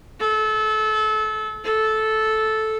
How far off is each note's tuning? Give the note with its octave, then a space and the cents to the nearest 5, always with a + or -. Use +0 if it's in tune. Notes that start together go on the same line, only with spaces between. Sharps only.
A4 -30
A4 -10